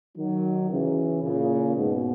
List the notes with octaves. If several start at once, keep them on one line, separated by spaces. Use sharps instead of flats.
D#3 F#3
C#3 E3
A#2 C#3
G#2 B2